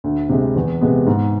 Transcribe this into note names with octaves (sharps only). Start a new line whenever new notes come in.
D2
C3 G#3
E2
C3 G#3 B3
G#2